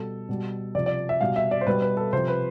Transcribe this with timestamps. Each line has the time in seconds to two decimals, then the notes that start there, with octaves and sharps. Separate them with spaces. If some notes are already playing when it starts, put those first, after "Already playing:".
Already playing: B2 G3 A4
0.29 B2 G3
0.75 C3 F3 D5
0.86 D5
1.09 E5
1.21 B2 G3 F5
1.36 E5
1.51 D5
1.61 C5
1.66 B2 G3 B4
1.82 B4
1.97 A4
2.13 C3 F3 C5
2.28 B4